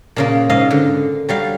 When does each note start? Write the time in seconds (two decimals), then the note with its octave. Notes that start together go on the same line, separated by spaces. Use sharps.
0.16 A#2 C#3 A#3
0.50 G#2 D#5 F5
0.71 D3
1.29 F#3 G3 F5